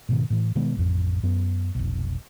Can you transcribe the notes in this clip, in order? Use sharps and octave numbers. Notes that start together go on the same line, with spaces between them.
G#2 B2 D#3
A2 E3
B2 D#3 G#3 B3
A1 F2
F#2 B3
F1 B1